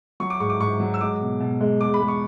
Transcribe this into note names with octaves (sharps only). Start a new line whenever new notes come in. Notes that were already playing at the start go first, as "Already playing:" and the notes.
F#3 C#6
D6
G#2 C#6
D6
G#2 C#6
F#3
E6
G#3 D6
B2
B2
G#3
E2 D6
B5
G#3
C#6